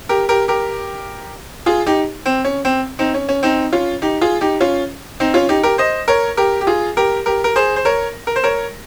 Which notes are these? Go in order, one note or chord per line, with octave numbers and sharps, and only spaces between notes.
G4 A#4
G4 A#4
G4 A#4
F4 G#4
D#4 G4
C4
C#4
C4
C4 D#4
C#4
C#4
C4 D#4
C#4 F4
D#4 G4
F4 G#4
D#4 G4
C#4 F4
C4 D#4
C#4 F4
D#4 G4
G4 A#4
C5 D#5
A#4 C#5
G4 A#4
G4
F4 G#4
G4 A#4
G4 A#4
A#4
G#4 C5
C5
A#4 C#5
A#4
C5
A#4 C#5